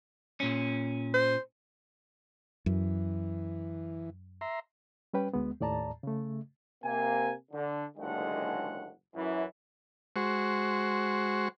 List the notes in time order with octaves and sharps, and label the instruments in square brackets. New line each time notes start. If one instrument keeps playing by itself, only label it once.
[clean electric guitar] A#2 C#4
[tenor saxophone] C5
[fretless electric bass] F#2 [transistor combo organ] E3
[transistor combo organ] E5 A#5 C6
[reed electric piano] G3 C#4 B4 G5
D2 G#3 B3
D#2 A2 D5 A5 A#5
C#3 A3
[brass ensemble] C3 A#3 G#5
D3
F#1 D#2 A2 D3 G#3 F#5
F#2 E3
[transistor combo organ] G#3 F#4 C5 C#6